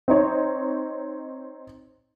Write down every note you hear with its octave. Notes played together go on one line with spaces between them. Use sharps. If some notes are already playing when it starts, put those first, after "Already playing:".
C4 D#4 C#5